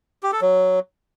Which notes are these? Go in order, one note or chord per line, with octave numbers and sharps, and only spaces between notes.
G4
A4
F#3